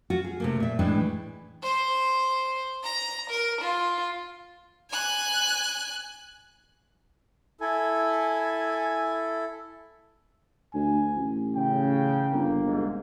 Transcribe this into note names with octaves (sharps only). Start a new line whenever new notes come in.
F4 F#4
G#4
C3 A3 A#3
A#2 E5
A2 E3 G#3 D4 G5
C5
A#5
A#4
F4
G#5 F#6
E4 A4 G#5
D2 G#5
A1
C#3 G5
G1 A#3
C2 G#2